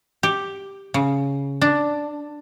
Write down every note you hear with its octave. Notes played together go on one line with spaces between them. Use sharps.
G4
C#3
D4